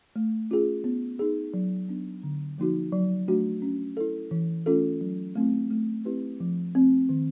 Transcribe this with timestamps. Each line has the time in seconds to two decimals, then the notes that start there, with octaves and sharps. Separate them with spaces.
0.16 A3
0.51 C#4 F4 G#4
0.84 B3
1.19 D#4 G#4
1.54 F#3
1.89 B3 D4
2.24 D3
2.58 F3 A#3 D#4 F#4
2.92 F#3
3.28 A3 D4 F#4
3.62 C#4
3.97 E4 A4
4.31 E3
4.66 A3 C#4 F4 A4
5.01 F#3
5.35 A3 C4 E4
5.71 A3
6.05 C4 E4 G4 B4
6.40 F3
6.75 A3 C4
7.09 D#3